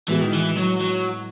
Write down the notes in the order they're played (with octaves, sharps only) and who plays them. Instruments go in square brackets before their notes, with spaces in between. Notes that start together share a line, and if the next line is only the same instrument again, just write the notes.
[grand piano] A2 G#3 B3 F#4 [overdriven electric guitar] E3
[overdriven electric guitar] D#3
E3
F#3
F#3